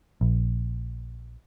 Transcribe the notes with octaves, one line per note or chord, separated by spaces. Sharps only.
A#1